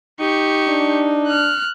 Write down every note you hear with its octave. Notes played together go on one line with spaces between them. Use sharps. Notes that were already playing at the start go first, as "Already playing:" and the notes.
D#4 G4 C#6
D4
F6 F#6